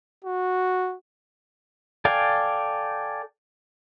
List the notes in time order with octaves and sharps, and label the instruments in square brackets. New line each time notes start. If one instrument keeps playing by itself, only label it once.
[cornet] F#4
[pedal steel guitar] A4 D5 F5 G5 G#5